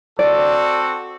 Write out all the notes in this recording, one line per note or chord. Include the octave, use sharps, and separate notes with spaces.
C4 F#4 A4 D5